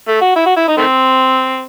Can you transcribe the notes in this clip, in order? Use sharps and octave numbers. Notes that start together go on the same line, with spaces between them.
A3
F#4
E4
F#4
E4
D#4
D#3 A3 C4